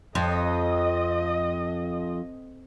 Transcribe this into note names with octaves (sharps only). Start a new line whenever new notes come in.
F2 D#5